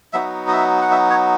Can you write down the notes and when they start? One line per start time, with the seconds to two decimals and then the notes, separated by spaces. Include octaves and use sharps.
0.13 F#3 B3 D#4 F#4 E5
0.48 D#5
0.52 E5
0.82 F#5
0.91 E5
1.10 C#5